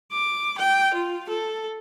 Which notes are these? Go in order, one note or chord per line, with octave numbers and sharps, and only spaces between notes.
D6
G5
F4
A4